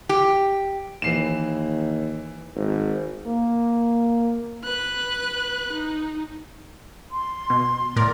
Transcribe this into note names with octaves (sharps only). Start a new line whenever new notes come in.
G4
D#2 E3 C7 E7
G#1
A#3
B4 F#6
D#4
C6
B2
A2 A#4 D5